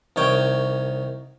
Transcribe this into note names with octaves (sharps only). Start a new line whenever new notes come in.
C2 D#3 C#5 G5